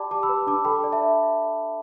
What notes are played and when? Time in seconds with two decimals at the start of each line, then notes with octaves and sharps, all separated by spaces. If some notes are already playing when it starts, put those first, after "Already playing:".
Already playing: G4 D5 G5 A5 B5 D6
0.11 G4 A5 D6
0.23 B5 E6
0.29 B4
0.47 D4 A5 D6
0.65 A4 G5 B5
0.84 D5
0.92 E5 A5